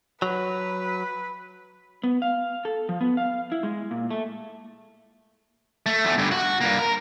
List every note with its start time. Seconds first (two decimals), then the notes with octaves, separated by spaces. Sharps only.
0.22 F#3 B4
2.03 B3
2.22 F5
2.65 A4
2.89 F3
3.01 B3
3.17 F5
3.52 E4
3.63 G#3
3.91 A#2
4.11 A3
5.86 A3
6.05 E2 A3
6.18 G2 D3
6.31 F#4
6.61 G2 A#3
6.79 A#4